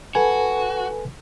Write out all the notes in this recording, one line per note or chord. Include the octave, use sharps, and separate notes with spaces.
F#4 A4 B4 G#5